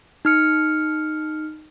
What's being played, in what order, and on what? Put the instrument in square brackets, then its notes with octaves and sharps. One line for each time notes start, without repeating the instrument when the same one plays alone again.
[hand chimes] D#4 F6 C#7